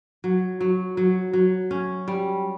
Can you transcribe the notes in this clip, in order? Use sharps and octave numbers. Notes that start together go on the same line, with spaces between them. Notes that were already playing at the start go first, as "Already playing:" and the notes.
F#3
F#3
F#3
F#3
C#4
G3